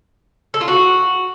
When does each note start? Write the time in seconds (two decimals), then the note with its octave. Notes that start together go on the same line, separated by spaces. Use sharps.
0.54 A4
0.61 F4
0.68 F#4